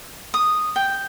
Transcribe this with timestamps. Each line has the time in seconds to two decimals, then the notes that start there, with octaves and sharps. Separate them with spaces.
0.34 D#6
0.76 G5